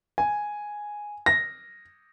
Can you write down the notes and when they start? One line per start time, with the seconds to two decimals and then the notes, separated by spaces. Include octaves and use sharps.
0.18 G#5
1.26 A#6